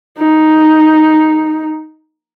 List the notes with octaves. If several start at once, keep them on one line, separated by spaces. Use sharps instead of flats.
D#4